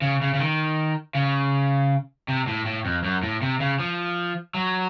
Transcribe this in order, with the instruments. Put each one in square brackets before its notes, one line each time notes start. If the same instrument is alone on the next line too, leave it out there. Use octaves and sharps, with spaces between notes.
[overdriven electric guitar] C#3
C#3
C#3
D#3
C#3
C3
A2
A2
F2
F#2
A2
C3
C#3
F3
F#3